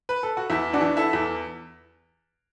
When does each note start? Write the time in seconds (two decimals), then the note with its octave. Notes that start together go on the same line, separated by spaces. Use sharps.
0.09 B4
0.23 A4
0.37 F#4
0.50 E2 E4
0.73 D4 F#4
0.81 E3
0.97 E4 A4
1.13 E2